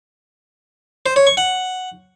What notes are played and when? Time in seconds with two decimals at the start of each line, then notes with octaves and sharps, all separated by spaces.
1.06 C5
1.16 C#5
1.27 C#6
1.37 F#5